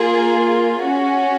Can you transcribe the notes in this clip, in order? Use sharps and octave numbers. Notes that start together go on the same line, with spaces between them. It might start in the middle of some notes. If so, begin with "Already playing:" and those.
Already playing: A#3 F4 G#4
C#4 F#4